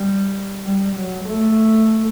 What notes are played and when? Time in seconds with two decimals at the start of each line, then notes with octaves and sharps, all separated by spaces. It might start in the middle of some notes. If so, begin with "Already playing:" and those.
Already playing: G3
0.66 G3
0.96 F#3
1.24 A3